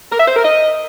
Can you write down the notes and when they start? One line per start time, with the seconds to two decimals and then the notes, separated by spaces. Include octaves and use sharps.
0.12 A#4
0.20 E5
0.28 C5
0.36 A#4
0.44 D#5